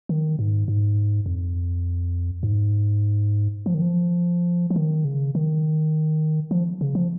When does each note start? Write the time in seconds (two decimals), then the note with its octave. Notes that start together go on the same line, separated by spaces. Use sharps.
0.09 D#3
0.39 G#2
0.68 G#2
1.26 F2
2.43 G#2
3.66 F3
3.74 D#3
3.81 F3
4.70 F3
4.76 D#3
5.05 C#3
5.35 D#3
6.51 F3
6.81 C#3
6.95 F3